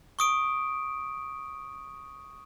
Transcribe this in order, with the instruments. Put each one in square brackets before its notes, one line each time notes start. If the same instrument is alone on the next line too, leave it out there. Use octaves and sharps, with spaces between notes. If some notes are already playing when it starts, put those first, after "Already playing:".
[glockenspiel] C#6 D#6 D7